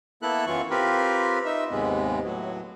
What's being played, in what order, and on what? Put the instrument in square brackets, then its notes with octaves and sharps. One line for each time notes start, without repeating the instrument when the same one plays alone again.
[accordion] A#3 B3 E4 A4 F#6
F#2 E3 F#3 F4 C#6
C4 F4 G4 A#4 B4
D#4 E5
D#2 G#2 C3 G#3 B3
A2 F#3